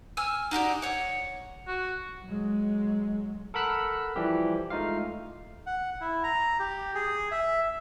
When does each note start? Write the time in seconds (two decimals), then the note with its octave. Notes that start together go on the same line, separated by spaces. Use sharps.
0.17 G#5 E6 F6
0.51 D#4 F#4 G4 D5
0.82 C#5 F#5
1.67 F#4
2.25 F#3 G#3
3.54 A4 A#4 F#5 B5 E6 F#6
4.16 E3 F3 G3 G4
4.70 G#3 A3 D#4 F4 F5
5.66 F#5
6.01 E4
6.23 A#5
6.59 G4
6.95 G#4
7.31 E5